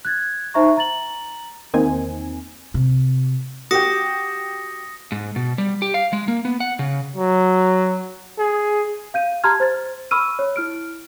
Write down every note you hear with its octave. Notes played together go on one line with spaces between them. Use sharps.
F#6 G#6 A6
D#4 C5 E5 A#5 C#6
A#5 A6 F#7
E2 D#3 A#3 C4 D#4 G#5
C3
F#4 G4 D#6 A#6 C#7
G#2
B2
G3
G4
F5
G#3
A#3
B3
F#5
C#3
F#3
G#4
F5 G6 D#7
G4 A5 A#5 C6 F6 G#6
C5 A6
B5 C#6 E6 F6 D#7
C#5
E4 F6 D7